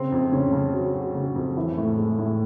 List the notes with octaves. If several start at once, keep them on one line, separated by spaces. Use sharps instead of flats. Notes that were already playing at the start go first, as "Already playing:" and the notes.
Already playing: C#3 C4
F2
C#3 C#4
C#3
F#3
F#3
C#3
F2
E3
A2
G#3
A2